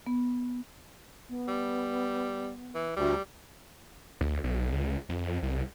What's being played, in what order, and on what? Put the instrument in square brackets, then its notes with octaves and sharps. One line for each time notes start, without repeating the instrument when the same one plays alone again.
[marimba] B3
[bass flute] B3
[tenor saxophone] G3
E3
[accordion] D2 [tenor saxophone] G3
[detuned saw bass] D2
B1
C#2
F2
C2